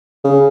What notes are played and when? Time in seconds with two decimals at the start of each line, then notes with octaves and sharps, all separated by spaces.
0.24 C#3